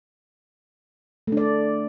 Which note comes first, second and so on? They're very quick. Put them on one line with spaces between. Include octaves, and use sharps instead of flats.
A3 D4 D5